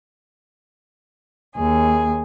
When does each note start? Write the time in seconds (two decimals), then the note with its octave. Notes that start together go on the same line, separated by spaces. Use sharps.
1.54 D#2 G#4